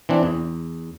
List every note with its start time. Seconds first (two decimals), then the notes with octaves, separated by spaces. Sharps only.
0.09 E3 C4 D4
0.23 E2